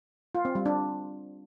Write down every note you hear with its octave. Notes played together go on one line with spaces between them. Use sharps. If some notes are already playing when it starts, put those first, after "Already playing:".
F4
C4
G3
D4